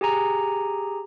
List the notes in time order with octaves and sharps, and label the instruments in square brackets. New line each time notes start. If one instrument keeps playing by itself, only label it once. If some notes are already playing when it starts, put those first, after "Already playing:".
[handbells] G4 G#4 G#5 A#5